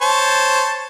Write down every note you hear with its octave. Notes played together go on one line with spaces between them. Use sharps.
C5 C#5 A5